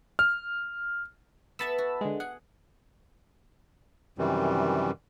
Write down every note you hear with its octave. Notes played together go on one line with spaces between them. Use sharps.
F6
B3 A4 E5 A5 B5 E6
F#4
D3 G#3
G#4 F#5
F#2 C3 D#3 E3 G3